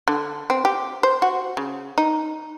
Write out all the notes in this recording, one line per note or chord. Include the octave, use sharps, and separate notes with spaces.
D3
C4
G4
C5
F#4
C#3
D#4